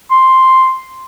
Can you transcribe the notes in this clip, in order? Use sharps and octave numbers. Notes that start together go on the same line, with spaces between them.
C6